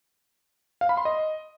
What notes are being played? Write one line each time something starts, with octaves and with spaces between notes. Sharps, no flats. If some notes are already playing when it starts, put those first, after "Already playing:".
F5
B5
C6
D#5